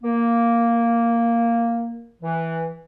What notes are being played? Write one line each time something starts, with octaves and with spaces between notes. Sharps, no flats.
A#3
E3